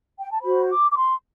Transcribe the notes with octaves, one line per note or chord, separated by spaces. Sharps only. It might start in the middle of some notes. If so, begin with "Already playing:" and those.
G5
A5
F#4 C5 B5
D6
D6
C6